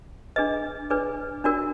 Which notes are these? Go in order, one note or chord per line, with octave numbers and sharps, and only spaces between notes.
D4 G#4 B4 D#5
D4 G#4 B4 D5
D4 F#4 A#4 D5